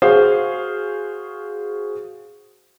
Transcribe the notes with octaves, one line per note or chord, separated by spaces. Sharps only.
F#4 G#4 C5 F5